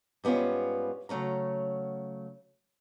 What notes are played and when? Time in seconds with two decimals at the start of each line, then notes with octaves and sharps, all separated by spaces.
0.24 G#2 G3 B3 C#4 F4
1.09 C#3 F#3 A3 C#4 A#5